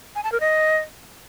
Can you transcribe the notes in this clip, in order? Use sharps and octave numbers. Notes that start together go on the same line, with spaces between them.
G#5
A5
A#4
D#5